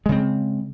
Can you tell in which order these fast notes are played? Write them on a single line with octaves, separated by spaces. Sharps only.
G#3 C#3 C4